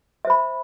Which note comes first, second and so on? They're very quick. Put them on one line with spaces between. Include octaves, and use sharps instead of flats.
E5 C5 B5